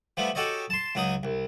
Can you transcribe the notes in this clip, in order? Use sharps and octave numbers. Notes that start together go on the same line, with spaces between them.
F3 G3 A3 B3
F#4 G4 A4 C#5 D#5
A5 C6
C#2 F#3 D#4 D#6
C2